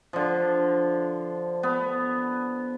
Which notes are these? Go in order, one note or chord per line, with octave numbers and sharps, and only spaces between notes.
D3 F3
B3